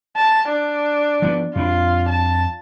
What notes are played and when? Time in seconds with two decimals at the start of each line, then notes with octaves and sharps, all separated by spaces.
0.17 A5
0.49 D4
1.22 F3 G3 B3
1.56 F2 D4 F4
2.08 A5